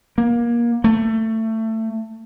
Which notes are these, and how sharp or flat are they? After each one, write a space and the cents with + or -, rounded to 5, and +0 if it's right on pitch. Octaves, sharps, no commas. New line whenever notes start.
A#3 +25
A3 +20